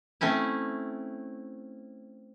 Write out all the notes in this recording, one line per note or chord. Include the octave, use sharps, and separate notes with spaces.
A3 C4 C#4 E4